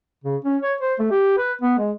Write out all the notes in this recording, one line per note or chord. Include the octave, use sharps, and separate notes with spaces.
C#3
C#4
C#5
C5
A3
G4
B4
B3
G#3